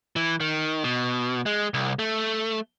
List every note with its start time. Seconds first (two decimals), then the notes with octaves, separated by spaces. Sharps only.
0.16 E3
0.40 D#3
0.84 B2
1.46 G#3
1.74 C2
1.99 A3